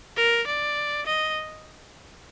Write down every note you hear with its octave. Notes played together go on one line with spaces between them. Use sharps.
A#4
D5
D#5